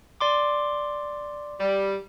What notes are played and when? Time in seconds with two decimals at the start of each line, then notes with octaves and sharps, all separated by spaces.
0.21 D5 C6 D6
1.60 G3